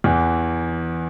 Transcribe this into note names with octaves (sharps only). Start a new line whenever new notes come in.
E2 E3